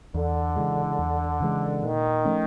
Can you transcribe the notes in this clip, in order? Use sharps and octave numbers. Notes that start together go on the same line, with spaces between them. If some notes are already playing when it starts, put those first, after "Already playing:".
E2 D3
C#3 E3 G#3
E2
C#3 E3 G#3
A#2 D#3
F3 A3 C#4